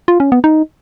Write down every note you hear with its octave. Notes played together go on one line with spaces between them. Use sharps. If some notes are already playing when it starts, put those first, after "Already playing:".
F4
C#4
B3
D#4